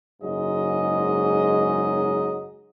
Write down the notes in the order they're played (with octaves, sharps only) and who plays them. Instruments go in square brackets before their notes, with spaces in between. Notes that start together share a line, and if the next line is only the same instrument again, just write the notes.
[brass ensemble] F#1 G#2 F#3 G#3 D#5